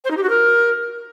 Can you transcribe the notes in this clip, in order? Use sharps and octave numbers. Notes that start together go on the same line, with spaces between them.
C5
D#4
G4
F#4
A#4